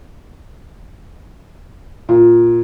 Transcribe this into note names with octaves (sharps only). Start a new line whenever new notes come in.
A#2